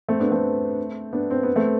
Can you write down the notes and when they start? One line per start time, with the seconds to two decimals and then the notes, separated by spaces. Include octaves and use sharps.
0.08 A3 C4
0.20 B3 D4
0.32 A3 C4
1.13 B3 D4
1.31 C4
1.43 B3
1.56 A3 C4